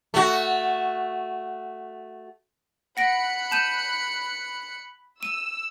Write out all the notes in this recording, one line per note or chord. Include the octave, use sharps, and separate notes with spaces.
A3 F#4
F#5 B5 F#6 A#6 C#7 D7
A5 G6 D#7
E6 D#7